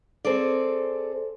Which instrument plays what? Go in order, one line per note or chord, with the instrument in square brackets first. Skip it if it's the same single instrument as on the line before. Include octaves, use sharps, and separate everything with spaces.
[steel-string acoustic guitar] C4 G#4 A4 D5